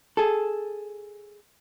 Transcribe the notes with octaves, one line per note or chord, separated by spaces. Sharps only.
G#4 A4